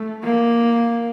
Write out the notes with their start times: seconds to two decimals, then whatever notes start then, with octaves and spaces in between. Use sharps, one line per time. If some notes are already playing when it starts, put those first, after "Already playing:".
Already playing: A3
0.24 A#3